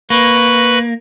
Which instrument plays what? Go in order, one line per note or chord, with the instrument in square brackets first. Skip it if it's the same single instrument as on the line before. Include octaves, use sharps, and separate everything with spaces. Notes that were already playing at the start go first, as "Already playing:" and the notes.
[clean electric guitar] A#3 [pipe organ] B4 B5 C#6